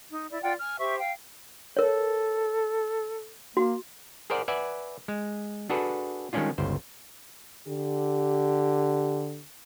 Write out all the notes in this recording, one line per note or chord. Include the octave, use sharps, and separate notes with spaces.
D#4
E4 D5
F4 D5 F#5 G5
G#5 F6
G4 C5 E5 C#6
F5 G5
A4 A#4 C#5
A#3 F#4
G#4 A#4 C5 D5 F#5
B4 D5 E5 F#5 G#5
G#3
D4 F#4 G#4 A4 B4
D#3 G3 G#3 C#4 D4 F4
G1 C#2 C5
D3 G4